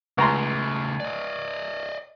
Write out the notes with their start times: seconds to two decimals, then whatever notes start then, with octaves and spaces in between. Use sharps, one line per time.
0.18 C#2 C#3 A3 A#5 C6
1.00 D5 D#5